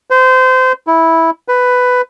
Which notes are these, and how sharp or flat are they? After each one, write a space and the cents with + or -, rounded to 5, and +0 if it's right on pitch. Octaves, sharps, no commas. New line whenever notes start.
C5 -25
E4 -10
B4 +10